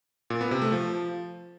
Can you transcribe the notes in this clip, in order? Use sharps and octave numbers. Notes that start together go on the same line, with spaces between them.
A#2
B3
C3
A3
F3